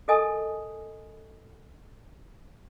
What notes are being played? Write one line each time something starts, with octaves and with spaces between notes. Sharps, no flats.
A4 A#4 D#5 G#5 A5 D#6